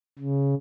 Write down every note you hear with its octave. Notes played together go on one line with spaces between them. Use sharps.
C#3